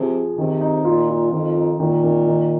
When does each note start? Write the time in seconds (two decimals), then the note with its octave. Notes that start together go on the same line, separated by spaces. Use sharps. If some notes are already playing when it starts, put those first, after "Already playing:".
Already playing: C3 F3 G#4
0.15 G#4
0.38 C3 D#3
0.61 D#4
0.85 A#2 F4
1.09 F4
1.32 F2 D#3
1.55 D#4
1.80 A#2 D#3
2.03 D#3
2.27 D#3